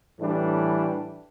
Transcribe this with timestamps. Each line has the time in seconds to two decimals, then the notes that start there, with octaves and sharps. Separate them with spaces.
0.19 A2 E3 G3 D4